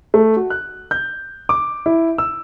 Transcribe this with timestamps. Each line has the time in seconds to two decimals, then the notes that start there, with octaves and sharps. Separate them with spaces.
0.14 A3
0.37 F#4
0.50 F#6
0.91 G6
1.49 D6
1.86 E4
2.18 E6